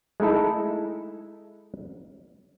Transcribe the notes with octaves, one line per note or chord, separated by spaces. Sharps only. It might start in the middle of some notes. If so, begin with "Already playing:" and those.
G#3 A3 D#4 E4 A4